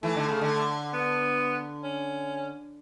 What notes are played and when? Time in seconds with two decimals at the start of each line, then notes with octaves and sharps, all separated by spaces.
0.03 E3 A3
0.16 D3
0.29 C#3
0.41 D3
0.93 B3
1.83 C#4